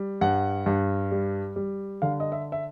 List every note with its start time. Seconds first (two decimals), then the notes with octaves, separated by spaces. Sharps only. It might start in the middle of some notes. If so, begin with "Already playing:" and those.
Already playing: G3
0.21 G2 F#5
0.66 G2
1.11 G3
1.56 G3
2.02 D3 F5
2.20 D#5
2.32 E5
2.52 E5